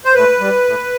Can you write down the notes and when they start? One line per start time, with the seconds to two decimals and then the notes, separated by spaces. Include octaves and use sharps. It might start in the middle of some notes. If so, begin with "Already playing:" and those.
0.05 C5
0.14 A2 B4
0.40 G3
0.65 A2